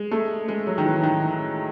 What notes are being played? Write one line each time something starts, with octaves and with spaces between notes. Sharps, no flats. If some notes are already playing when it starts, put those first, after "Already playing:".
Already playing: G#3
A3
G#3
F#3
D#3
E3
D#3